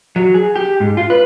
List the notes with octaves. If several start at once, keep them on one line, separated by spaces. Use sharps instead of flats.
F#3
G#4
G4
G#2
F4
B4